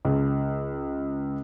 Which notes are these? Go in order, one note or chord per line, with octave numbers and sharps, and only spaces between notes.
C#2